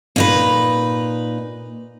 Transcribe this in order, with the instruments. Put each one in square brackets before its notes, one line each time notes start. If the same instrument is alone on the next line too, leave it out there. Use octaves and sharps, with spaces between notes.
[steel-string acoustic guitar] A#2 D#4 B4